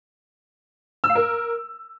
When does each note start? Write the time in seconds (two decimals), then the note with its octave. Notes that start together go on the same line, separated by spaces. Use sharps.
1.04 E6
1.10 F5
1.15 A#4